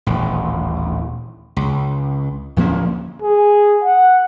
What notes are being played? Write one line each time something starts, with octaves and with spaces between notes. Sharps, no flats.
D#1 A1
C#2
D1 F3 A#3 C#4
G#4
F#5